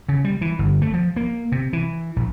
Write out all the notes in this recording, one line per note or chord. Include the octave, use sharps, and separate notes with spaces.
C#3
G3
E3
G1
A3
F3
A#3
C3
E3
A#1